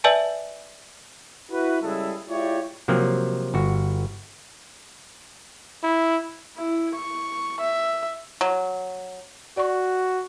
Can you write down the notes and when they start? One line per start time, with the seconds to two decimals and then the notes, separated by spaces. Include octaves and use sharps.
0.04 B4 D5 E5 G#5 A5
1.52 E4 F#4 B4
1.83 C#3 G3 G#3 E4 G#4 A4
2.29 G#3 E4 F4 G4 C#5 D5
2.88 C3 F3 F#3 A#3 C4
3.54 G1 F#4
5.84 E4
6.58 E4
6.95 C#6
7.61 E5
8.41 F#3
9.57 F#4 D5 C#6